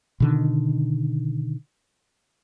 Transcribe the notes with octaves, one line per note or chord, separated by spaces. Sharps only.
B2 D3 D#3